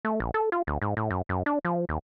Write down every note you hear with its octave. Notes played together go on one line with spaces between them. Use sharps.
A3
A#1
A4
F4
D2
G#2
A2
F#2
F#2
D4
F3
D#2